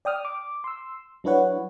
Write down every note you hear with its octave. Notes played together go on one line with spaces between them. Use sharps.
D5 G5 D#6 F6
D6
C6 E6
F#3 D4 E4 B4 C#5 F#5